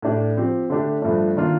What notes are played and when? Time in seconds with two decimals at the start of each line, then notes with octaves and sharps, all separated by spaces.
0.02 A2 A3 D4 G4 D5
0.36 F3 C4 G4
0.70 D3 A3 D4 G4
1.02 G2 F3 A3 D4
1.36 D#3 A#3 D4 F4